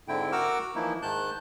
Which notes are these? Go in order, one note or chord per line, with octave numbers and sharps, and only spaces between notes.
G#2 D3 C4 E4 G5
F#4 A#4 F#5 D6 E6 F6
E3 F3 A#3 D#4 E4
G#2 D#3 A5 F#6 G6